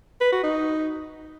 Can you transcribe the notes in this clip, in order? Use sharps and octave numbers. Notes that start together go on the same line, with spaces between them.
B4
F#4
D#4